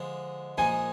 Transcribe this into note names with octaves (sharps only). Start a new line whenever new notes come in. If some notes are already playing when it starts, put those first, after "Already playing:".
Already playing: D3 F3 G#3
A#2 F3 G#3 D#4 G#5